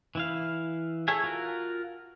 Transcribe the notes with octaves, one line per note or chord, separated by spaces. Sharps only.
E3 E4 F5
G#4 A4 C#5 E5 G#5
F4 F#4 A#4